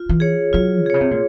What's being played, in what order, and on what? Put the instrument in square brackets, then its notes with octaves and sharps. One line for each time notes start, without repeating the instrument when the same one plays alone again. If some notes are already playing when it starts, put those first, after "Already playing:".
Already playing: [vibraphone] F4
[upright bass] E3
[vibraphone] G#4 C#5
[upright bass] F#3 [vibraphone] F4
[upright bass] C3 [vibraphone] G#4
[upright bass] C#3 [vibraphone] C#5
[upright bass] C3
A#2